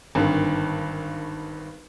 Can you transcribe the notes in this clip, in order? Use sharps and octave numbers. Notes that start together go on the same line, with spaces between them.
G#1 G2 D3 D#3